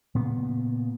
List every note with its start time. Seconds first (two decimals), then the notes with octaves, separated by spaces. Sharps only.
0.15 A#2 C#3 B3